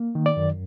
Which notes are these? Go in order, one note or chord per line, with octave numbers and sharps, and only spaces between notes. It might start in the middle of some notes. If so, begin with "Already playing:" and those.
Already playing: A#3
D#3
D5
F#2